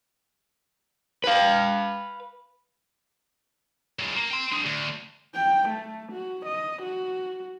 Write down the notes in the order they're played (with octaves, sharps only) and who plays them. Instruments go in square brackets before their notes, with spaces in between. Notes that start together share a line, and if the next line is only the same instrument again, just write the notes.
[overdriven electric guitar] B4 F5
[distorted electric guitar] F#3 G#3
A#3
G5 C6
D4 G#4
D2
[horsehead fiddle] G5
A3
F#4
D#5
F#4